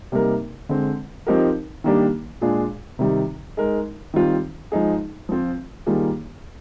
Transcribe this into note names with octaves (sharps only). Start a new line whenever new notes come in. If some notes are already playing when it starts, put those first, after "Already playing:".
C3 G3 A#3 D#4 A#4
D3 G#3 C4
F3 C4 D#4 G4 A#4
D#3 G3 A#3 D4 G4
A#2 G#3 D4 F4 G#4
C3 D#3 G3
G#3 D#4 A#4
D#3 G3 C4 F4
F3 G#3 D#4 G#4
F3 C4 F4
D#3 G3 A#3 F4 G#4